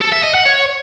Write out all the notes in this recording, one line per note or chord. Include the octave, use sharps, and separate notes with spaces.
A4
E5
D#5
F#5
C#5